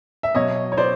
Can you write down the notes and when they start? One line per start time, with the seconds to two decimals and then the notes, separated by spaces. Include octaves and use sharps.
0.23 E5
0.35 B2 F#3 C#5 D#5
0.72 C#5
0.77 C5 D5